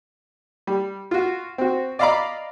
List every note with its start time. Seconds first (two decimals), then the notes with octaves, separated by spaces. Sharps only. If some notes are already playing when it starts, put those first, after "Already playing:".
0.67 G3
1.11 F4 F#4
1.58 C4 F#4
1.99 D5 D#5 F5 A#5 B5 D6